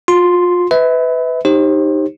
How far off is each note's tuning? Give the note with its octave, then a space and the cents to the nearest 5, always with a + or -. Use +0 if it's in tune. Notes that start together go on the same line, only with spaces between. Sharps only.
F4 +30 C6 +0
B4 +20 E5 -35
D#4 -5 G4 +5 C5 +35